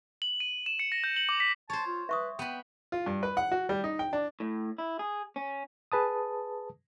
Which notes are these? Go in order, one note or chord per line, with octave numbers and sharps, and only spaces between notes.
F#7
D#7
E7
C#7
A#6
G6
F#7
D6
B6
C5 C#5 A5
F4
B4 E5 C#6 D#6
B3 G5 B5
F4
G2
B4
F#5
F#4
G3
D#4
G5
D4
A2
E4
G#4
C#4
G#4 B4 A5 D#6